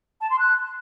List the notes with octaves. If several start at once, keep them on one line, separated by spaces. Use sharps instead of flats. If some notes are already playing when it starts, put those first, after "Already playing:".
A5
C6
F#6